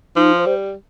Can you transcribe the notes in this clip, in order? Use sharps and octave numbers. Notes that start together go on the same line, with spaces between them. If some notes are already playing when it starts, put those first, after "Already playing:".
F3 D#4
C5
G3